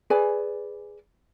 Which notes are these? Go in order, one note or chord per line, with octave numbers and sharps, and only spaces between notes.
G#4 B4 D5 G#5